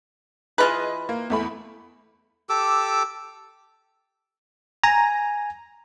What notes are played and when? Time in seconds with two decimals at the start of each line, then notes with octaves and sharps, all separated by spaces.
0.58 E3 F4 G#4 B4 D#5
1.09 A#3
1.30 E2 A3 B5
2.49 G4 A4 D6 E6
4.84 G#5 A#5